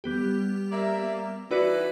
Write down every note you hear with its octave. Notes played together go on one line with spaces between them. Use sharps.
G3 B3 G4
A#3 D5 E5
E3 D#4 E4 F#4 B4 D5